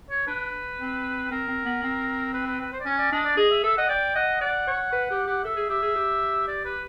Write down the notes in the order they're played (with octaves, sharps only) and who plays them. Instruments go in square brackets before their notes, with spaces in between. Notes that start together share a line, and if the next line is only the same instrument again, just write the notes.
[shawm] C#5
[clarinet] D4 [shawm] B4
[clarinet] C4
[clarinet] C4 [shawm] A#4
[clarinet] C4
B3
C4
[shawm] B4
B4
B4
C5
D5
[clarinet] C#4 [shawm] C#5
[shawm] D5
[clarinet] D4 [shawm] D#5
[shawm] D5
[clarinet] G#4 [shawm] D#5
[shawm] E5
[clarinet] A4 [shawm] E5
[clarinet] D#5 [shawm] F#5
[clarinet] D5 [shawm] G5
[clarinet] D#5 [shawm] F#5
[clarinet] D5 [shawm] F#5
[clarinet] C#5
B4
G4
G4
[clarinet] A4 [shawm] E5
[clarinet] G#4
[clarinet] G4 [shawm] E5
[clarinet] G#4
G4
[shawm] D5
B4